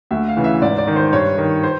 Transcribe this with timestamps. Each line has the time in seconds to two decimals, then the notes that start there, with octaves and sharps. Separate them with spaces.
0.11 D2 E5
0.28 F5
0.37 C#3 E3
0.44 E5
0.62 G#2 D5
0.78 D5
0.87 D#3
0.96 C5
1.13 G2 C#5
1.38 D#3
1.63 C5